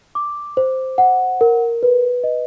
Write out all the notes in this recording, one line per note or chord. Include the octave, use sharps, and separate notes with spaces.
D6
C5
F#5
A#4
B4
D#5